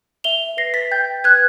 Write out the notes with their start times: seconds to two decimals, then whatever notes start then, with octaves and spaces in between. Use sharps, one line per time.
0.24 E5 F7 G7
0.57 B4 A#6 C7
0.74 A6 B6
0.91 G5 G6 A6
1.24 B4 F#6 G#6